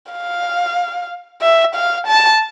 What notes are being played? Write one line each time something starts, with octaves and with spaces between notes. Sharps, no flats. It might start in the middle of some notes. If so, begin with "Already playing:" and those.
F5
E5
F5
A5